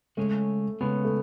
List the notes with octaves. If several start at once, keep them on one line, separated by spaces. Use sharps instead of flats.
C#3 G#3 A3 C#4 G#4 C#5
C#3 G#3 B3 C#4 G#4 C#5
A3